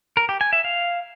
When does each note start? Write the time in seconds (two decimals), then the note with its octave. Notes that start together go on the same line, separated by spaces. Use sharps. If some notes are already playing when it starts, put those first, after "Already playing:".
0.17 A#4
0.29 G4
0.41 G#5
0.53 E5
0.64 F5